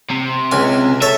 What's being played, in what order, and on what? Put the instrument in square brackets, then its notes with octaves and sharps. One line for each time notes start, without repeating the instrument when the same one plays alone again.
[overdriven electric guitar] C3
[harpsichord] C#2 G#5
[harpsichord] A4 C#5 [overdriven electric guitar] E5